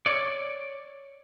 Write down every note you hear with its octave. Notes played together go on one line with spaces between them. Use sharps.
C#5 D5